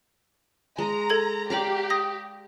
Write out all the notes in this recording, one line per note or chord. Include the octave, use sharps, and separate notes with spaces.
G#3 A#5
A4 G#6 F#7
G4 D5 F5 A#5
D#6 A#6